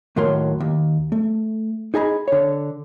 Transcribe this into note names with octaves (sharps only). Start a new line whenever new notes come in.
D#2 A2 F#3 A#4 C6
D#2
A3
D#4 G#4 D#5 A#5 B5
D3 C#5